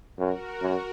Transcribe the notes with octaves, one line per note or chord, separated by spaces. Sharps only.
F#2 F#4 A#4
F#2